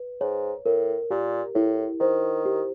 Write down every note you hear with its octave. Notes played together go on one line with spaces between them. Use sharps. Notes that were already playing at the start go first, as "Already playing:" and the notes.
Already playing: B4
G#2 C#5
A2 A#4
A#2 G4
A2 E4
D#3 C5
G4